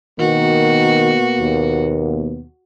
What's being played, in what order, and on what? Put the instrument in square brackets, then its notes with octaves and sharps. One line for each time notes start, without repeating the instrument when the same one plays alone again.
[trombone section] B2 A#3 B3 [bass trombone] D#3 [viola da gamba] F#4
[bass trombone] D#2